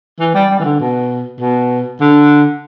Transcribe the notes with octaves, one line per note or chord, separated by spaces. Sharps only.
E3
G3
G3
E3
D3
B2
B2
D3